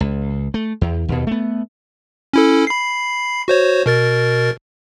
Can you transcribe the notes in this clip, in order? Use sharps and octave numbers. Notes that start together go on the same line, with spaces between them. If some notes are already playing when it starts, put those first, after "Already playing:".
C#2
A3
E2
D#2 B2
A3 B3
C#4 E4 A4
B5 C7
F#4 C5 C#5
B2 A#4 A6